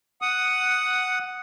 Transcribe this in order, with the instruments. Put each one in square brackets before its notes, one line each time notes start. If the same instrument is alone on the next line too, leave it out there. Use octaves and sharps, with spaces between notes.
[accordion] F#5 D#6